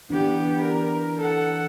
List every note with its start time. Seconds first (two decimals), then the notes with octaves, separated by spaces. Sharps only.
0.10 E3 B3 D4 G4
0.63 A#4
1.18 A4 F#5